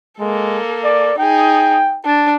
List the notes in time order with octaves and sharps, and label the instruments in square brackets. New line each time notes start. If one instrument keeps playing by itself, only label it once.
[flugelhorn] G#3 [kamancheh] A#3 A4
[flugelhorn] D5
[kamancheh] D#4 G#4 [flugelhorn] G5
[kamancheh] D4 [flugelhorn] A5